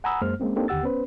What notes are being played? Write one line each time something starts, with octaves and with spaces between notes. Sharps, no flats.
F#5 G#5 A#5 B5 D#6 E6
F#2 G#3 A#3 C5 F6
G#3 A#3 C4 C#4
A#3 C4 D4 D#4 G4 A4
D#2 D3 G4 F#5 E6 A6
B3 C#4 B4 C5